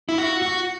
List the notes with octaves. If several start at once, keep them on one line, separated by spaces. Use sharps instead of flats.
E4
F#4
F#4